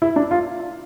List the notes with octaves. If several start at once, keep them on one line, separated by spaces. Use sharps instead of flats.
E4
D4
F4